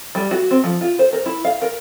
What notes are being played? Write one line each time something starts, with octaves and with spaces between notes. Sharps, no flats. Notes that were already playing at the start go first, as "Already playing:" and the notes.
G3
F#4
C4
F3
F4
C5
A#4
E4
F5
A#4